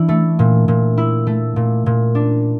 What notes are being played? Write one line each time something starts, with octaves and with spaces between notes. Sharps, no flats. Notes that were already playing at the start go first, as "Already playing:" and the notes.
Already playing: E3 D4 E4
A3
A#2
A#2
E4
A3
A#2
A#2
D4